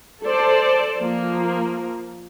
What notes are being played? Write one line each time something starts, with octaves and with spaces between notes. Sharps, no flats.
A4 C5 D5 A5
F3 A#3